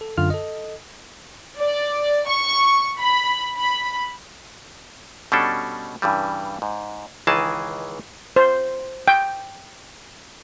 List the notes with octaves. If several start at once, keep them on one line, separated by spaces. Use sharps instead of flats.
A4
F#2 D3 F4 F6
A4 D#5
D5
C#6
B5
B5
B2 G3 C#4 D4 A4
G2 C#3 E3 G3
G#2
C#2 D#3 E3 G#4 D#5 A5
C5
G5